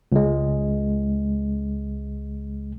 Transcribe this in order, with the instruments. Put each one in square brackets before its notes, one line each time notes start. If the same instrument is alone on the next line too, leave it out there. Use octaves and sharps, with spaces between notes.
[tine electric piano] C#2 G#3